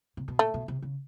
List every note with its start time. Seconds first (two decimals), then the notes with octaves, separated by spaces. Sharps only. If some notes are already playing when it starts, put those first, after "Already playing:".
0.17 C3
0.28 B2
0.39 A#2 A3
0.54 B2
0.68 C3
0.82 C#3